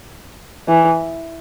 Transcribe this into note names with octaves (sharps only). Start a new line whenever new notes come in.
E3